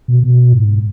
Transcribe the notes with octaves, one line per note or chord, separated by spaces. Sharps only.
B2
B2
G#2